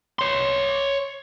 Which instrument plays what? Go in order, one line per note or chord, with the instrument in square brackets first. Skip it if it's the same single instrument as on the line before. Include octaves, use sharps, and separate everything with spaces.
[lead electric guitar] C#5 C6